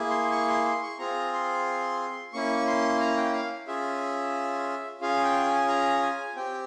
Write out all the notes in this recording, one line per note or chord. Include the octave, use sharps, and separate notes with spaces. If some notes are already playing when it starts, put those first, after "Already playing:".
Already playing: A#3 E4 G#4
C6
C#6
C6
C6
C#6
C4 F4 G#4 A#5
C6
A#3 C#4 E4 C#6
C6
A#5
G5
F5
C#4 F4 G#4 E5
C#4 F4 G#4 F5
G5
G#5
A#5
G#5
C4 G4 G5